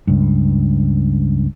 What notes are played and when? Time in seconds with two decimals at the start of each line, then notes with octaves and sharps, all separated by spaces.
0.07 C#2 G2